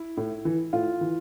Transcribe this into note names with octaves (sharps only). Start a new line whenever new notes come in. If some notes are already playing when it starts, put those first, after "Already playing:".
Already playing: E4
A2
E3
A2 F4
E3